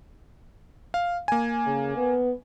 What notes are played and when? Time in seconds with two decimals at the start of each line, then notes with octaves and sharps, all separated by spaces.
0.94 F5
1.28 A#3 G#5
1.66 C#3
1.97 B3